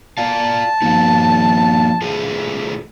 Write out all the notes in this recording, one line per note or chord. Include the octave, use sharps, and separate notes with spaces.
F4 D5 F5 A5
F3 A#3 D#4
A3 F4 G#4